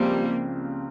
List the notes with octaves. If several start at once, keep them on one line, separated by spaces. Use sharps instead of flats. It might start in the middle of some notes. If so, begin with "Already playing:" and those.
Already playing: C#2 C#3 F3 G3 A#3 C4